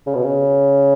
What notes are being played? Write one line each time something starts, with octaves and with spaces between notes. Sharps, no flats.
C#3
B2
C#3